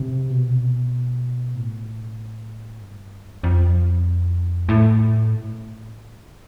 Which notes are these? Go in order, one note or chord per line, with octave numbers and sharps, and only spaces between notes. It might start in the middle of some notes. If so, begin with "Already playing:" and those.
Already playing: C3
B2
A2
G2
F2
A2